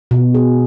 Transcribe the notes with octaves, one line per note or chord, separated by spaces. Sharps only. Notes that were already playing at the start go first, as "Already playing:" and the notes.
B2
G#4